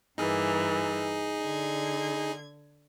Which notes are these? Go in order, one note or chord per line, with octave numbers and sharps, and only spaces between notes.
G2 E3 A#3 D#4 G#4
D3 G#6